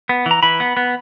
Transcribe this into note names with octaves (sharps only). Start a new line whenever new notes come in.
B3
E3 A#5
E3 B5
B3
B3